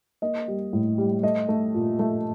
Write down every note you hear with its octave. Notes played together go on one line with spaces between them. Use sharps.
A#3 D#5
G3
A2
G3
A3 D#5
A3
A#2
A3